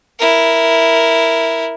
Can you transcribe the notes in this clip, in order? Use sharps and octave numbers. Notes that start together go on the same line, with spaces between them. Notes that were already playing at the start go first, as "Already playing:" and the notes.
E4 A#4